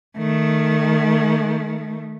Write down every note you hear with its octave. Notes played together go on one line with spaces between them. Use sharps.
D#3 A3